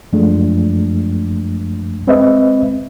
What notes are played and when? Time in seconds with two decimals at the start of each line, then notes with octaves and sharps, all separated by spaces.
0.13 F#2 F3 G#3 A3 D4
2.07 G#3 C4 B4 D#5 E5